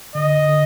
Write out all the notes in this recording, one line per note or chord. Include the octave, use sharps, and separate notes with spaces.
D3 D#5
D3